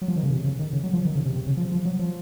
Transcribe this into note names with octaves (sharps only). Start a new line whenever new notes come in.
F#3
F3
D#3
C#3
C3
C#3
D#3
C#3
F#3
F3
D#3
C#3
C3
C3
C#3
F3
F3
F#3
F3